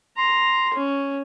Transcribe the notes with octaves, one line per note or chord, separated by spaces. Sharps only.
A#5 C6
C#4